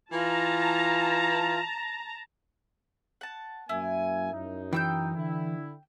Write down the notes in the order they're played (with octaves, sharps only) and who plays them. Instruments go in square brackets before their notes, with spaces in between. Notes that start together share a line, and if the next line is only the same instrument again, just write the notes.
[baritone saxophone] E3 [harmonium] F4 [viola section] A5 A#5
[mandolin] F#5 A5
[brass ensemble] F#2 A#3 G#5 [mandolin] E4
[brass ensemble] F#2 D#4
[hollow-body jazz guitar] E3 [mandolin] G5 E6 G6
[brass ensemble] D3 E4